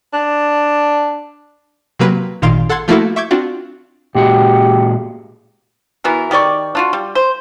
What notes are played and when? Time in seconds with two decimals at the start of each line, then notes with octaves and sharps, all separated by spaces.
0.13 D4
1.99 C3 F#3 A#3 B4
2.42 G#1 A#2 D#3 F5 C6 D7
2.69 A4 F#5 A5 C6 G#6
2.88 F3 A3 A#3 E4 F#4 A4
3.16 E5 C#6 D6 G6 G#6
3.31 C4 D4 F4 F#4
4.15 A#2 G#3 F#4 G4
6.04 E3 B3 F#4 A#4
6.31 D#3 G4 D5 C#6
6.75 D4 F4 F#4
6.93 G3
7.15 C5